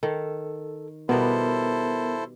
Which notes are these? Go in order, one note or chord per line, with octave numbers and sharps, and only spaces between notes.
D#3 A4
B2 G3 B3 E4 A4 A#4 C5